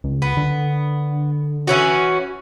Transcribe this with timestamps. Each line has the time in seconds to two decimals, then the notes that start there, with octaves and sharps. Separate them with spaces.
0.04 C#2
0.22 B3
0.37 D3
1.67 E3 C#4 F#4